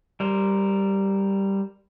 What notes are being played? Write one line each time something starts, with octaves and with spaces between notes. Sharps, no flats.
G3 A#4 C5